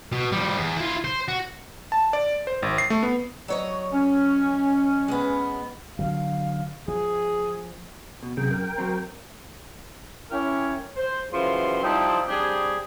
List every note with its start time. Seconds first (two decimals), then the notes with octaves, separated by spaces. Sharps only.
0.12 B2
0.32 F3 G3
0.57 E2
0.77 E4 F4
1.04 C5
1.28 F#4
1.92 A5
2.13 D5
2.47 C5
2.62 G#1
2.78 C7
2.90 A3
3.03 B3
3.48 F#3 C#5 D#5
3.93 C#4
5.08 G#3 B3
5.99 D3 F#3 F5
6.88 F3 G#4
8.23 B2
8.37 F#2 C3 G#4 G5
8.51 A#4 G5
8.78 F#3 C4
10.31 C#4 E4 G4 A#4 C#5
10.96 C5
11.32 F#2 C#3 E3 F3 C6
11.82 F3 G3 C4 D#4 E4
12.27 G3 C4 D4 G4 G#4